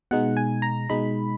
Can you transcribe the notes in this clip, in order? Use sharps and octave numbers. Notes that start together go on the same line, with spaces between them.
B2 G#3 D#4 F#5
G#5
A#5
B2 G#3 D#4 B5